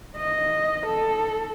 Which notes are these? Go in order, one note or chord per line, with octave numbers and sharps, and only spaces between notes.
D#5
A4